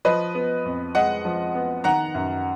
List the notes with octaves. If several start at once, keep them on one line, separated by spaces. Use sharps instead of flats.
F3 B4 D#5
B3
F2
G#3 D#5 F#5
F3
B3
D#3 F#5 A#5
F#2